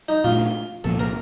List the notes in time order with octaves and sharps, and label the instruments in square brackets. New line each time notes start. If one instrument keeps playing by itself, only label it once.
[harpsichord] D#4
[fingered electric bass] A#2 A3 D4 [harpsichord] F4
[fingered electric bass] C2 A#2 F3 A#3 [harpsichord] A4
[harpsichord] A#4